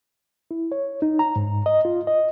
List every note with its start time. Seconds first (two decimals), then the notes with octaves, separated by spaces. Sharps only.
0.51 E4
0.72 C#5
1.02 D#4
1.19 A#5
1.36 G#2
1.66 D#5
1.85 F4
2.07 D#5